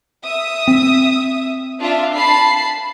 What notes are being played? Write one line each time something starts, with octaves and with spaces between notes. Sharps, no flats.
E5 D#6
C4
D4 F4 E5
A5 B5 C7